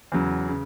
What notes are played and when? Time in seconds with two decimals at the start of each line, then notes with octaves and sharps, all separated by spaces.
0.12 E2 C#3 F#3
0.48 C#3